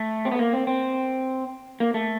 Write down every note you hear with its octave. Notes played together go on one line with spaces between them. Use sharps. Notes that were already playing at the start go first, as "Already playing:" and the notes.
Already playing: A3
C4
B3
A#3
C4
C4
A#3
A3